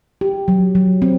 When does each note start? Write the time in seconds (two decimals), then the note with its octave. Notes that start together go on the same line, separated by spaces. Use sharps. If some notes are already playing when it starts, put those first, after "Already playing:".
0.21 G4
0.48 F#3
0.75 F#3
1.02 C4